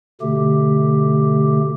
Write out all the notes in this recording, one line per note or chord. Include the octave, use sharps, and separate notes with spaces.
B2 D3 A3 G4